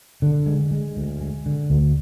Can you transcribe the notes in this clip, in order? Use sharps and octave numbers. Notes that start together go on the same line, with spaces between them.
D3
G#3
G#3
D2
G#3
D3
D2